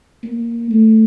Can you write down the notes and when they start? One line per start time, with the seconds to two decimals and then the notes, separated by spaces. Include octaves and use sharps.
0.23 A#3
0.71 A3